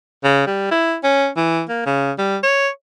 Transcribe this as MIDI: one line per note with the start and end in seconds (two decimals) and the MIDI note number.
0.24 0.44 49
0.47 0.68 55
0.71 0.97 64
1.03 1.29 61
1.36 1.63 52
1.69 1.85 58
1.86 2.12 49
2.19 2.38 55
2.43 2.68 73